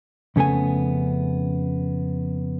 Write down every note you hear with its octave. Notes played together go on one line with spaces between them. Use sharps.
F2 C#3 A3 B3 G#5